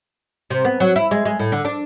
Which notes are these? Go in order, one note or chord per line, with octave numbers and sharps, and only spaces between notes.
C3
B3
F#3
E4
G#3
G#3
A2
D3
D4